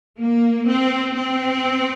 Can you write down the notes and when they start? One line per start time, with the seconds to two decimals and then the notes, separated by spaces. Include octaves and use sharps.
0.19 A#3
0.67 C4
1.15 C4